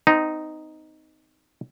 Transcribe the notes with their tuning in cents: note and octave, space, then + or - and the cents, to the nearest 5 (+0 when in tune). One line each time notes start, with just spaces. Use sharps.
C4 -40 D#4 +0